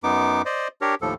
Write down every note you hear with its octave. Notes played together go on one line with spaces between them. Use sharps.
F#2 B3 D#4 D6
C5 D5 D#5
D4 G4 A#4 C#5
D#2 A2 F3 A4